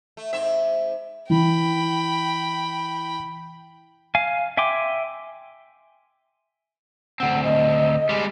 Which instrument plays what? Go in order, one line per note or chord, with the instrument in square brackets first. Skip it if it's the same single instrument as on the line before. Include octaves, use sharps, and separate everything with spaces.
[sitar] A3
G#2 C4 E5
[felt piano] E3 [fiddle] G5 B5
[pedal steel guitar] F5 G#5
E5 G5 G#5 C6 D6
[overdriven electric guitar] D2 C4 [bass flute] F#5
[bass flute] D#5
[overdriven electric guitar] G3 G#3